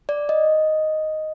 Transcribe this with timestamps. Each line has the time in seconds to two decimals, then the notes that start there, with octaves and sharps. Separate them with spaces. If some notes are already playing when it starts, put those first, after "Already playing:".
0.09 D5
0.29 D#5